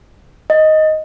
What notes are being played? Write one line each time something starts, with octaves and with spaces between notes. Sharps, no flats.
D#5